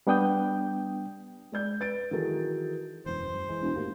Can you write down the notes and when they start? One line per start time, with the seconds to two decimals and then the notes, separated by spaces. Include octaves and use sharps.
0.07 G3 B3 D4 G5 D#6 G6
1.52 G#3 D5 G6
1.80 B4 A6 D7
2.11 D#3 E3 F#3 G#4 A4
3.06 E1 F#2 E3 C5
3.35 F#2
3.49 E3 G#3
3.62 E1
3.76 D#2 A2 A#3